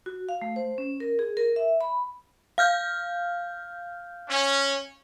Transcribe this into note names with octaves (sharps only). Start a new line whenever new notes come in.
F#4
F5
A3
C5
C#4
A#4
G#4
A#4
E5
B5
F5 F6 G6
C#4